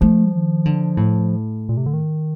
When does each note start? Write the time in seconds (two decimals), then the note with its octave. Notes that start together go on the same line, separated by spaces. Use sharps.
0.01 F3 A3
0.33 D#3
0.65 D3
0.97 A2
1.69 A#2
1.77 C3
1.86 D3
1.94 D#3